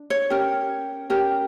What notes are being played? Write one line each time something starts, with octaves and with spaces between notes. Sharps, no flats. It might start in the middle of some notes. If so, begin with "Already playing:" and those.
Already playing: D4
C#5
C#4 G4 A#4
C#4 G4 A#4